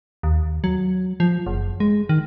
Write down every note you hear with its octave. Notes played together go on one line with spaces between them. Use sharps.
D#2
F#3
F3
F#1
G#3
D#3